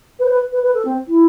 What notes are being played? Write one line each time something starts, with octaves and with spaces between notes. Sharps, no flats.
B4
C5
B4
B4
B4
A4
C4
E4